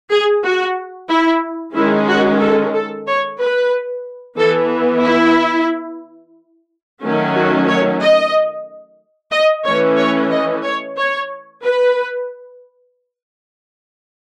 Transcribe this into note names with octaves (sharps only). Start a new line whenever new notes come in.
G#4
F#4
E4
D#3 G#3 C#4 E4
F#4
A4
A4
C#5
B4
E3 B3 A4
E4
D#3 F#3 A3 C#4
F#4
C#5
D#5
D#5
E3 A3 C#4 C#5
C#5
D#5
C#5
C#5
B4